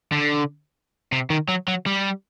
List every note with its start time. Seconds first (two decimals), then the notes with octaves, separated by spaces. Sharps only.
0.12 D3
1.12 C3
1.30 D#3
1.49 F#3
1.68 F#3
1.86 G3